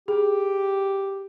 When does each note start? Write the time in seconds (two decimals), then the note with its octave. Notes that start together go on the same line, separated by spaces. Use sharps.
0.08 G4 G#4